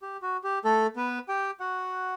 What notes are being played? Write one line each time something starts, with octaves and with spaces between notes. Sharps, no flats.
G4
F#4
G4
A3 A4
B3 B4
G4 G5
F#4 F#5